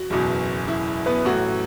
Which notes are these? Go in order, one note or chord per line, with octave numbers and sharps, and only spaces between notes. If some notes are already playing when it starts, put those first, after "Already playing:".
Already playing: F#4
F#1 E2 B2
E4
B3 B4
A1 A2 F#3 F#4